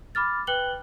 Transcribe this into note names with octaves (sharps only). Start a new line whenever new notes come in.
B5 D6 F6 A6
B4 G5 F#6 F#7 G7